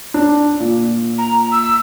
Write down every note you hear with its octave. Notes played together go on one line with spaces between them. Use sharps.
D4
A#2
A#5
E6